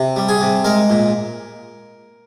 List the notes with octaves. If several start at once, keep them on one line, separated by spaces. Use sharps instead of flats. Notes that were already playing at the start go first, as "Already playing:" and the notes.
Already playing: C3
G3
G#4
C3
G#3 A#4
A#2